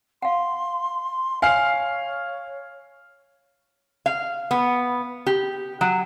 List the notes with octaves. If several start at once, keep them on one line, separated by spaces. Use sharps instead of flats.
F5 F#5 C6
C#5 F5 G#5 F6 C7
F5
B3
G4
F#3